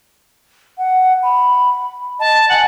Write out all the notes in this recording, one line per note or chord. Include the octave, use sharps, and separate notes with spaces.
F#5
B5
D#5 A5
F#5 G#5